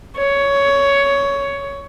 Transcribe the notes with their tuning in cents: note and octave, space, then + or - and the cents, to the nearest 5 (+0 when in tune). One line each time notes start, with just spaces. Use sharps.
C#5 +10